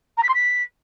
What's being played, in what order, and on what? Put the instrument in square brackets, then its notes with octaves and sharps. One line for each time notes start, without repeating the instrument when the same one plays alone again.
[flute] A#5
B6
C6
B6